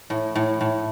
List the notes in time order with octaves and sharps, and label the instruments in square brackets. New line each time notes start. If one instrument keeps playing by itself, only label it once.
[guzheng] A2
A2
A2